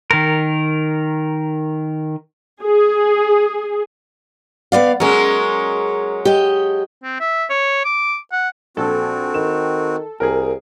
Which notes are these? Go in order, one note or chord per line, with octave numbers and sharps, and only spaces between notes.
D#3 A#4
G#4
B3 D5 F5
F#3 G#3 C#4 G#4 A#4
G4 D#5
C4
E5
C#5
D6
F#5
A#1 C4 F#4 A4
D#3 E7
C2 G#4 A#4